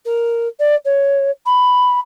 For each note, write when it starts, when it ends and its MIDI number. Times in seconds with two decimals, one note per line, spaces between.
0.05 0.47 70
0.59 0.75 74
0.85 1.30 73
1.46 1.99 83